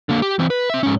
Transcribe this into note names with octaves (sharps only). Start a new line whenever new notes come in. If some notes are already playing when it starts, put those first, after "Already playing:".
D3 A#3
G4
E3 C4
B4
C4 E5
G#2 C#4